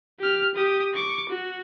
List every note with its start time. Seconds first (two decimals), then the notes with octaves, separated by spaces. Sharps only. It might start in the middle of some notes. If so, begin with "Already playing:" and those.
0.20 G4 F6
0.55 G4 D#6
0.94 C#6 D6
1.29 F#4